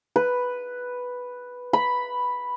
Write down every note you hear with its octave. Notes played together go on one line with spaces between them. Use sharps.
B4
B5